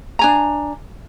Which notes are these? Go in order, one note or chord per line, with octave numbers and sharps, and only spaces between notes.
D4 G#5 A#5